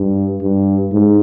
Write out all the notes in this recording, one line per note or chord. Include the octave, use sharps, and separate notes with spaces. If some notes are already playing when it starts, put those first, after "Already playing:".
Already playing: G2
G2
G#2